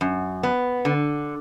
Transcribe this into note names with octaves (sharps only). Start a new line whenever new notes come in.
F#2
B3
D3